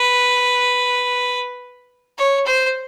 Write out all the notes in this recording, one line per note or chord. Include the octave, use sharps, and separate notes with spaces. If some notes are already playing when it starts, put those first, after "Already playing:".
Already playing: B4
C#5
C5